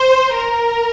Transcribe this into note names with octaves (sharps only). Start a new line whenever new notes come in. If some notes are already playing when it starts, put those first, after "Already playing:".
Already playing: C5
A#4